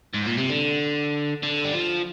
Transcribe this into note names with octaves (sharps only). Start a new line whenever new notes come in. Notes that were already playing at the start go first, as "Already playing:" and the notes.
G#2
A#2
C3
D3
D3
G3
F3